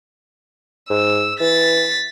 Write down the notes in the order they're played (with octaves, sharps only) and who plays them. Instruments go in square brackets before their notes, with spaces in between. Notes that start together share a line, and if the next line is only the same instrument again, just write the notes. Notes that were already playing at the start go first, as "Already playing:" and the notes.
[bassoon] G#2 [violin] E6
[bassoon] E3 [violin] A6 B6